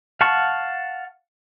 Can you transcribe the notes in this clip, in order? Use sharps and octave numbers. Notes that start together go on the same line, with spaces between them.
F5 F#5 A5 C#6